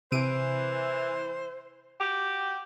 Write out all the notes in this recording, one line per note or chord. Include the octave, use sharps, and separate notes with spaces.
C3 E3 C5 D7 D#7
F#4 G4